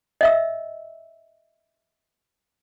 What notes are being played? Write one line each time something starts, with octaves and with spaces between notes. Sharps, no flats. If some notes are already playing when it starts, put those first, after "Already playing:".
D#5 E5 E6